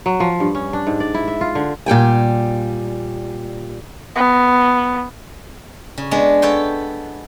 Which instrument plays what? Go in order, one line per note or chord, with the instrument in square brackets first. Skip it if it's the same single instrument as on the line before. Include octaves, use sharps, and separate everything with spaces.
[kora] F#3
F3
G2
C#4
D4
G#2
D5
E4
E5
F4
D3
[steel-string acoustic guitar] A#2 G3 G5 G#5
[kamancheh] B3
[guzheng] C#3
G#3 B3 D4
B3 A4 B4 C#5 G5